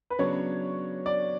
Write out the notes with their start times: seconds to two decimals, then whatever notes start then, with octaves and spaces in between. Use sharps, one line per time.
0.10 B4
0.19 C#3 F#3 B3 D4 C#5
1.06 D5